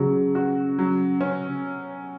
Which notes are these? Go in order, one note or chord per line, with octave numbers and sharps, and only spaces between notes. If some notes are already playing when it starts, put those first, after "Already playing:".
Already playing: C#3 F#3
F#4
F#3
C#4